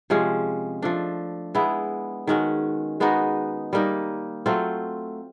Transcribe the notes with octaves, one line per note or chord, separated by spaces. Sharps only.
C3 F3 G#3 C#4
F3 A3 D4
G#3 B3 E4
D#3 G#3 C#4 F#4
G#3 B3 D#4 F#4
G3 A#3 D#4
F#3 A3 C4 F4